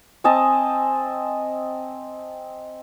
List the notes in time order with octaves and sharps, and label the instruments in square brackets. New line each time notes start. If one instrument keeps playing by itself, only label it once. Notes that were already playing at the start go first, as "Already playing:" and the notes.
[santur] C4 D#5 G#5 A5